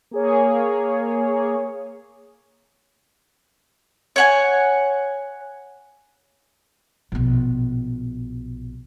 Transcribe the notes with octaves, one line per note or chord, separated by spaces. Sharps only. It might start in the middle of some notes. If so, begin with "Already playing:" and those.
A#3 G#4 C#5
C#5 F#5 G#5
A#1 B2